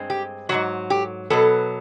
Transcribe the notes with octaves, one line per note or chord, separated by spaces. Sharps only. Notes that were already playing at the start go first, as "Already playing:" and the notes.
Already playing: G2 G#3 C4
G4
G#2 D#3 F#3 F#4
G4
B2 F#3 B3 A4